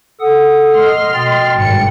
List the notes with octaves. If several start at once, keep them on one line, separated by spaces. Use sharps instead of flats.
A4 F#5 D#6
D#5 C6 F6
B2 G5 A6
G#1 G2 C#7